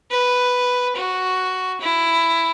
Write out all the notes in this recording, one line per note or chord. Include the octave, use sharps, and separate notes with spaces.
B4
F#4
E4